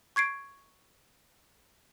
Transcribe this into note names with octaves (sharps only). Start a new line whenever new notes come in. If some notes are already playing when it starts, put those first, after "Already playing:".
C#6 G#6 C7 D7